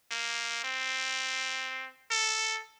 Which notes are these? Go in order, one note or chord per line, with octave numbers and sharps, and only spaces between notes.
A#3
C4
A4